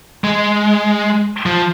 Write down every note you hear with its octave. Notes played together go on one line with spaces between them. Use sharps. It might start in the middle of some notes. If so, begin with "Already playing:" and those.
G#3
F3